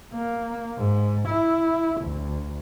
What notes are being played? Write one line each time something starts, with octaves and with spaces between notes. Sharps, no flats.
A#3
G#2
E4
D2